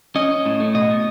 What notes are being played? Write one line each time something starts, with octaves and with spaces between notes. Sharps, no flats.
C#4 D#5
C#4
A2
A3
B2 D#5
B2